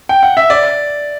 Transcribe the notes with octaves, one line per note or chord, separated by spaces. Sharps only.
G5
F#5
E5
D5